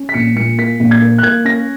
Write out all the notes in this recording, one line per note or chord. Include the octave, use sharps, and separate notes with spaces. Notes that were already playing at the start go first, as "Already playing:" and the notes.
Already playing: C#4
B6
A#1 C#7
A#2 C#7
A#3 B6
A#1
G#6
A#3
F#6
A#3 G#6
C#4 A#6